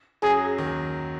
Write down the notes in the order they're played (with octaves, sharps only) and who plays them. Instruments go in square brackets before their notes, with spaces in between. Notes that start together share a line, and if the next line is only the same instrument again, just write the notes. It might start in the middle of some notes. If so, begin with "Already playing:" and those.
[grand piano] F#2 F#3 [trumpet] G#4
[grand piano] D#2 D#3